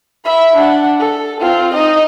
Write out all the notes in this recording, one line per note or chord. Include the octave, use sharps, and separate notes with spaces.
E5 B5
D4 F#5
A4
C4 F4
D#4 D#5